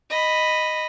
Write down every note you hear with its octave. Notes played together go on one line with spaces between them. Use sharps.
D#5 B5